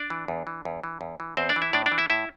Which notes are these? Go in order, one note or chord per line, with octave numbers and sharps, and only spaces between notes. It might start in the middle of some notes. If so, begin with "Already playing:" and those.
Already playing: D4 D5
E3
E2
E3
E2
E3
E2
E3
E2 C4 C5
D4 D5
E3
E4 E5
A2 D4 D5
D4 D5
E3
E4 E5
A2 E4 E5